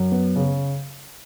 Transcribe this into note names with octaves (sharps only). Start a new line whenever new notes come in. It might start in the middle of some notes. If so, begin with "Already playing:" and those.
Already playing: F#2
B3
C#3